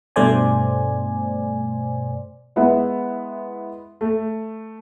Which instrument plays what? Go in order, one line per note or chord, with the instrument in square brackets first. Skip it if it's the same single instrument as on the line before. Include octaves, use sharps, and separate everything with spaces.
[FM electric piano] G2 B2 A3 C5 D5 G#5
[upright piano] G#3 B3 E4 B4 E5 F#5
A3